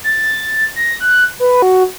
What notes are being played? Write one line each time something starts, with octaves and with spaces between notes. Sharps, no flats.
A6
A#6
F#6
B4
F#4